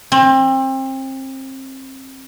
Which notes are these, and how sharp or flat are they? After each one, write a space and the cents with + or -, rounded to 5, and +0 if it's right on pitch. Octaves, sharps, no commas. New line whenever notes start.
C4 +30